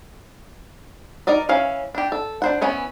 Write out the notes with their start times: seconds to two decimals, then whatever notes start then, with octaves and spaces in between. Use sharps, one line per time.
1.27 D#4 A#4 D5 D#5
1.49 E3 C#4 F5
1.95 D4 G4
2.12 A4
2.42 D4 C5 F#5
2.61 E3 B3 C#4 C#5